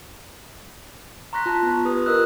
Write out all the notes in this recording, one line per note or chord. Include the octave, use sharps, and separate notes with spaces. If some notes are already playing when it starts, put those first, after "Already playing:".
A#5 C6 C#6 F#6 A#6 B6
F4 A5
B3 F4
G4 B4 D#6
F4 A#4 D#5 D#6 E6 F#6